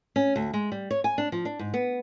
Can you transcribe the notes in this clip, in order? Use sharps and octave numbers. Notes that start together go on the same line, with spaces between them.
C#4
D2
G#3
G3
C#5
G#5
D4
F3
D4
G#2
B3